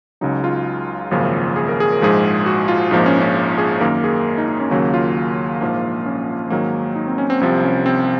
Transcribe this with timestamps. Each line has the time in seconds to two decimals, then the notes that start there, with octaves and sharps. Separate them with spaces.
0.21 C#2 C#3 F#3 D#4
0.44 F4
1.11 G#1 F#2 C#3 F3 A#3
1.56 G#4
1.68 A#4
1.80 G#4
1.92 A#4
2.01 A#1 G#2 F3 G#3 G#4
2.46 F#4
2.68 F4
2.91 A#1 G#2 F3 A#3 D#4
3.06 C#4
3.21 C#4
3.37 F4
3.58 G#4
3.81 F#2 D#3 A#3 A#4
4.04 G#4
4.38 D#4
4.48 D#4
4.60 C#4
4.71 D#2 C#3 F#3 A#3 C#4
4.94 F4
5.61 A#1 G#2 F3 A#3
6.06 C#4
6.50 G#2 D#3 F#3 A#3
6.96 D#4
7.07 C4
7.18 C#4
7.30 C4
7.41 C2 C3 F3 C4
7.63 C#4
7.86 C4